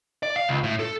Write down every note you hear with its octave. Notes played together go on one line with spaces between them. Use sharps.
D5
F5
C#2
A2
A4